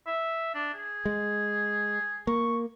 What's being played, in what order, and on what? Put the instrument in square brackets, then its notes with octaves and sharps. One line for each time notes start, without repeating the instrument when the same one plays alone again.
[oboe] E5
D4
G#4
[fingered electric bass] G#3
[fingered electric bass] A#3 [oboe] C#6